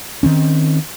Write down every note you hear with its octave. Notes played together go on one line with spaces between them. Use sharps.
D#3 C4 C#4